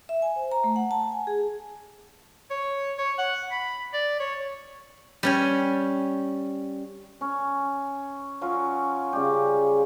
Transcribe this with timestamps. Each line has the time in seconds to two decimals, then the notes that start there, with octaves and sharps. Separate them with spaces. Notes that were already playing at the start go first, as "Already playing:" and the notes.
0.09 E5
0.22 G#5
0.36 C5
0.52 A#5
0.64 A3
0.76 F#5
0.91 A5
1.12 G#5
1.27 G#4
2.50 C#5
2.98 C#5
3.18 F#5
3.51 B5
3.93 D5
4.20 C#5
5.23 G3 C#4 G#5
7.21 C#4
8.41 F#3 C#4 F4
9.13 C#3 G3 G4